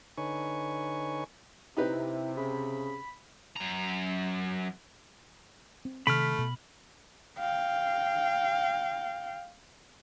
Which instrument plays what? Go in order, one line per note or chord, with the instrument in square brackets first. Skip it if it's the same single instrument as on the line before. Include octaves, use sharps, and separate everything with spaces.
[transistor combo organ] D3 D#4 B4 C#5 G#5 C#6
[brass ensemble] C3 [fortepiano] D#4 G4 B4 [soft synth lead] E4
[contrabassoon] C#3 [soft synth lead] B5
[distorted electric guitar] F#2 A#5
[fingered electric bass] C4
[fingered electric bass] C3 D#3 [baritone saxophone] A3 [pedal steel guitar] B5 F6
[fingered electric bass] B2
[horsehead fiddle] F5 G5